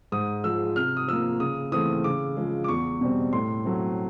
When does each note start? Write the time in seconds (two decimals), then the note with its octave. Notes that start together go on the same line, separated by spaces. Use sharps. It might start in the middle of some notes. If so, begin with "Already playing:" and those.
0.12 G#2 D#6
0.44 F3 G#3 E6
0.76 C3 F6
0.97 D#6
1.08 F3 A#3 E6
1.40 C#3 D#6
1.72 E3 A3 C4 D#6
2.04 C#3 D6
2.37 F3 G#3
2.64 D6
2.68 E2 C#6
3.01 B2 G3 C4
3.33 A2 C6
3.65 F#3 A3 C4